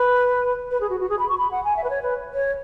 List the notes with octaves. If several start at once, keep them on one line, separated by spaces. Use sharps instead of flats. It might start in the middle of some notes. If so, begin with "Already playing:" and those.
Already playing: B4
B4
G#4
F#4
F#4
G#4
B5
C#6
B5
F#5
G#5
E5
B4
C#5
B4
C#5